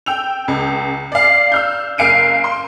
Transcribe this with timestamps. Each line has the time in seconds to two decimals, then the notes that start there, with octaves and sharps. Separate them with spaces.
0.06 G5 E6 F7
0.48 C#2
1.12 D5 F5
1.52 E6 F6 G6
1.98 F#1 F5 D7 D#7
2.44 C6